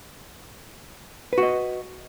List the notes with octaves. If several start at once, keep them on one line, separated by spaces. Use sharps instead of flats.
F#4 B4 D#5